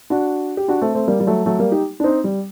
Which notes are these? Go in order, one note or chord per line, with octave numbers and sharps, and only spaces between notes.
D4 F#4
G4
D4 F#4
A3 C4
A3 C4
G3 A#3
G3
F#3 A3
F#3 A3
G3 A#3
D#4 G4
D4
C4 D#4
G3